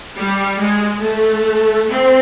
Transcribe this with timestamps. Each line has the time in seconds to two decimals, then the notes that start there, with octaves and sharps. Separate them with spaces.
0.17 G3
0.60 G#3
1.03 A3
1.89 C4